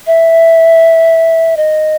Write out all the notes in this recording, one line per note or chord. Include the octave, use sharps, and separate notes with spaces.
E5
D#5